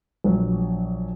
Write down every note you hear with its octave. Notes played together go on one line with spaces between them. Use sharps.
A#1 F#3